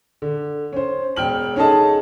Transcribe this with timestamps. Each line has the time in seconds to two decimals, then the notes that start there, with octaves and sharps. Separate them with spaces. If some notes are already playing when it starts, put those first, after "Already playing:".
0.22 D3
0.73 C#4 C5
1.16 E1 G5 F6 F#7
1.56 C#4 D#4 G#4 A4 D#5 A5